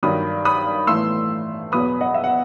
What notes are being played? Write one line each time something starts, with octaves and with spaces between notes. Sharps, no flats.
G2 D#3 F#3 B5 D#6
B5 D#6
A2 E3 A3 C6 E6
E2 B2 F#3 B3 B5 D#6
D#5 F#5
E5
F#5